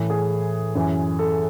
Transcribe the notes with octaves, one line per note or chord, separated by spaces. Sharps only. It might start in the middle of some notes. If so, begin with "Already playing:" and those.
Already playing: A2 E3
G#4
F#2 E3
A4